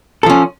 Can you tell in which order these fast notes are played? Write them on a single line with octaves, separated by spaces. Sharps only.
A4 F3 C#4